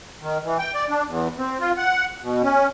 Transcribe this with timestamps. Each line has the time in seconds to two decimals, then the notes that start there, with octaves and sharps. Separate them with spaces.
0.21 D#3
0.44 E3
0.59 G5
0.74 D5
0.89 D4
1.07 E2
1.38 C4
1.60 F4
1.77 F#5
2.22 B2
2.43 C#4